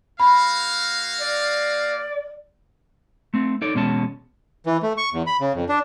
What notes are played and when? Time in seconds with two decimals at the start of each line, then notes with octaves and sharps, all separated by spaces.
0.20 A#3 F#4 F5 B5
1.21 D5
3.34 A3 C4
3.62 D#4 A4 C#5 D5
3.74 E2 B2 G#3 C#4 A5
4.66 E3
4.83 A3
4.97 C#6
5.13 E2
5.27 B5
5.41 C#3
5.55 F2
5.69 D4